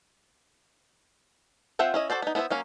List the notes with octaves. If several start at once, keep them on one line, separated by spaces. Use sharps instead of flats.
C4 F4 E5 F#5 G5
C#4 E4 D#5
F#4 A4 C5 D5
B3 D#4
B3 E4 C5 D#5 E5
F#3 A#3 C#4